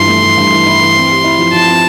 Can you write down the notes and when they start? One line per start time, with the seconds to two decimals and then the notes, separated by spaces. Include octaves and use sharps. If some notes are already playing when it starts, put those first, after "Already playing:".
Already playing: G2 E3 F3 C6
0.08 A3
0.22 E3
0.37 G2
0.52 E3
0.66 E4
0.81 E3
0.96 C4
1.09 G4
1.24 E4
1.38 F3
1.53 F3 A5
1.67 C4